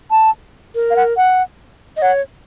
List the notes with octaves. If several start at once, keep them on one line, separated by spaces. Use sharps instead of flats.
A5
A#4
F5
F#5
F#5
D#5
C#5 F#5